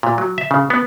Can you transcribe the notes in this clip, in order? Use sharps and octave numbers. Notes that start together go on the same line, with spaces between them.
A#2
F#3
E5
C#3
B3